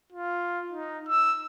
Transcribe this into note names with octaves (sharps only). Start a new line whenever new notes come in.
F4
D#4
E6